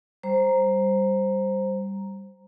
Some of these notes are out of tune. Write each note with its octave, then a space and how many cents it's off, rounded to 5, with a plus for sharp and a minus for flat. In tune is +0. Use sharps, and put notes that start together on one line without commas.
G3 +0 C5 +5 A#5 +0